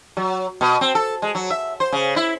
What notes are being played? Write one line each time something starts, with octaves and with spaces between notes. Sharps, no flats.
F#3
B2
C4
A4
G#3
F#3
E5
C5
C#3
E4